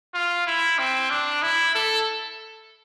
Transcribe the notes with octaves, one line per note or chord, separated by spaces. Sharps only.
F4
E4
C4
D4
E4
A4